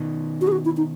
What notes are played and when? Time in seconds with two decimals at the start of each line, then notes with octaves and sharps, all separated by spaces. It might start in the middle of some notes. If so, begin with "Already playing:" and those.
Already playing: B2 D#3
0.41 F#4
0.48 G#4
0.52 F#4
0.65 E4
0.77 D#4